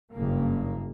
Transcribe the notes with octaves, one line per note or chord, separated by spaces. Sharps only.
F#1 G2 C#3 A#3